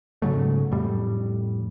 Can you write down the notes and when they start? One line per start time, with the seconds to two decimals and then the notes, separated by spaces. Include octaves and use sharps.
0.22 G#2 C#3 F#3 A3
0.71 F2 A2 G3